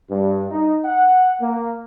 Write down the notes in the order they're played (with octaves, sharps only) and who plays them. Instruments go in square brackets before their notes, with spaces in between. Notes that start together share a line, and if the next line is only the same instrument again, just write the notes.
[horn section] G2
D#4
F#5
A#3